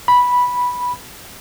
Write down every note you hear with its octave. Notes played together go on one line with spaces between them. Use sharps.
B5